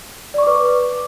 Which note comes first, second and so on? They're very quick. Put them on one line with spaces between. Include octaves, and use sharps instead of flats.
D5 C#6 D6 B4